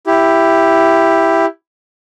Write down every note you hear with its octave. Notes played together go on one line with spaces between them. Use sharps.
E4 G4